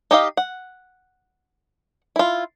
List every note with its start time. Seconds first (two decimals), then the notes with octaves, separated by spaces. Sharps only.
0.11 D#4 G4 D#5 F5
0.37 F#5
2.16 E4 F4